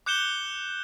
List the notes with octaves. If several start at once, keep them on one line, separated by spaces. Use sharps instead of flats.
D6 F#6 G6 C#7 E7 G7